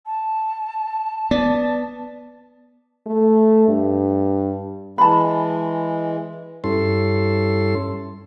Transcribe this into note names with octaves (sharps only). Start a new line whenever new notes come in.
A5
B3 D5
A3
G2
E3 G#3 A5 B5
G2 C#4 E4 A4 C6